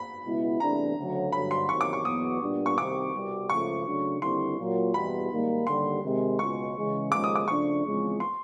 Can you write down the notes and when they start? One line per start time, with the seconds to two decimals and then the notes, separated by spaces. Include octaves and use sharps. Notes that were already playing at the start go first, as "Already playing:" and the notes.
Already playing: B5
0.24 C#2 B2 G#3 B3 E4
0.60 E2 C3 E3 A3 D4 A#5
0.97 D2 C#3 F#3
1.32 G2 D3 F#3 B5
1.51 C6
1.68 E2 C3 D#3 F#3 C#6
1.81 D6
1.93 C#6
2.05 E2 B2 F#3 B3 D#6
2.41 A#2 G3 B3 D4
2.66 C#6
2.77 C2 C3 D#3 D6
3.13 C2 B2 G3
3.50 C#2 C#3 F3 A3 C#6
3.86 C#3 F#3 A3 D4
4.22 D#2 D3 G3 C4 E4 C6
4.58 A#2 F#3 A#3
4.94 E2 B2 G3 B5
5.30 G#2 D#3 G3 A#3
5.67 D#2 D3 G3 C6
6.03 C3 D#3 G#3
6.39 C#2 B2 G#3 C#6
6.76 C#3 E3 G#3
7.12 D#2 C#3 F3 G#3 D6
7.24 D#6
7.36 D6
7.48 C#3 F3 A3 D4 C#6
7.83 E2 C#3 F3 G#3 C4
8.20 C6